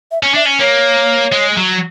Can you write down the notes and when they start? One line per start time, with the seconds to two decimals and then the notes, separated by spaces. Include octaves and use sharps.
0.11 E5
0.23 C#4
0.35 D4 E5
0.46 C#4
0.60 A#3 C#5
1.32 G#3
1.57 F#3